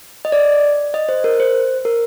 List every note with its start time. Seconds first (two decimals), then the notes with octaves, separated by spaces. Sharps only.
0.25 D#5
0.32 D5
0.94 D#5
1.09 C5
1.24 A#4
1.40 C5
1.85 A#4